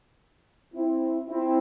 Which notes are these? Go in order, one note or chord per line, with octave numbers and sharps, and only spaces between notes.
C4 E4
C4 E4